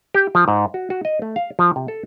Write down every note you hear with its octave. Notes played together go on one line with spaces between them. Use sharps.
G4
F3
G#2
F#4
F#4
D#5
A3
F5
F3
C3
A4